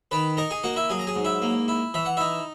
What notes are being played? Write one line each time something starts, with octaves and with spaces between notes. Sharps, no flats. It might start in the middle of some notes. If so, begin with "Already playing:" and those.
D#3 B4 B5
D#4 A#4 A#5
G#4 G#5
A#3 F#4 F#5
E4 E5
F#3 G#4 G#5
A#5
G#4 G#5
G#2
E4 E5
A#3
E4
E3 E5
F#5
D#4 E4 E5